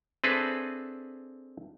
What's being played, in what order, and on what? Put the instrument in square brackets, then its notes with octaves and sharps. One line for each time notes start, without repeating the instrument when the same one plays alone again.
[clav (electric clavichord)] C4 D4 G#4 A4 B4 E5